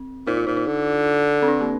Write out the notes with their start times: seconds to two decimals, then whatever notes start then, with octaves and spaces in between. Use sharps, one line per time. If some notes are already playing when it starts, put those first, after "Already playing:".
Already playing: C4
0.27 A#2 D#4
0.37 F4
0.47 A#2 D#4
0.57 D#4
0.67 D3
1.42 C4
1.48 D4
1.61 A#3